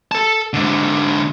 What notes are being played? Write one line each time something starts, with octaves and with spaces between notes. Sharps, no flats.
A4 A5
G#2 D3